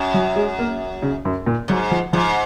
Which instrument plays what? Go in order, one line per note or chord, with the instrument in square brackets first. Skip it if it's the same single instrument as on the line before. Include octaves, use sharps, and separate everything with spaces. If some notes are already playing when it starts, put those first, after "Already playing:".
Already playing: [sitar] F#2
[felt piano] F#3
G#3
A#3
C#3
F#2
A#2
[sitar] G#2 [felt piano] F#3
[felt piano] F3
[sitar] G#2 [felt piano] F3